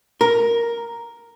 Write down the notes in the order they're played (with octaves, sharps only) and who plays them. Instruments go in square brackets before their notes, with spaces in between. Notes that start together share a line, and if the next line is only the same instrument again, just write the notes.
[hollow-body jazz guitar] A#4